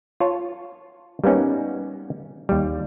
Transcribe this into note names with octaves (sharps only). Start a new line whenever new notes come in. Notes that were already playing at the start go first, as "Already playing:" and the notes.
F4 C#5 A5
G3 A#3 B3 C#4 D#4
D#2 G3